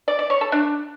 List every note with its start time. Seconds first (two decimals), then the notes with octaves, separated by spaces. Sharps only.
0.08 D5
0.19 D5
0.30 C#5
0.41 A4
0.52 D4